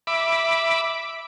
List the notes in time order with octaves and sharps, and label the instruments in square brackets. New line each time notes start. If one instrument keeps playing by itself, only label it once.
[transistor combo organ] E5 B5 D6